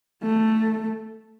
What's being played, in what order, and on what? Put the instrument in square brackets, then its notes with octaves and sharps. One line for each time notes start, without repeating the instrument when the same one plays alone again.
[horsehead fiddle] A3